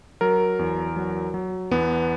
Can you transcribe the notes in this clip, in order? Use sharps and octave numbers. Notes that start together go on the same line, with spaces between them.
F#3 A#4
E2
F#3
F#3
E2 B3